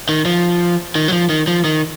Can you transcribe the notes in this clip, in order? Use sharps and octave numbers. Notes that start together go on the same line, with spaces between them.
D#3
F3
D#3
F#3
F3
D#3
F3
D#3